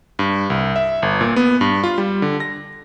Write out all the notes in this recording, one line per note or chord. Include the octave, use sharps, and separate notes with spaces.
G2
C2
E5
G1
A#2
B3
G2
F4
G3
D3
A#6